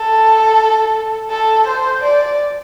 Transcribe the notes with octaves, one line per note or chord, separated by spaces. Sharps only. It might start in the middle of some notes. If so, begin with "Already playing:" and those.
Already playing: A4
A4
C5
D5